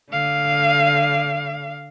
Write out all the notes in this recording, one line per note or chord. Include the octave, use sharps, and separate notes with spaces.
D3 F5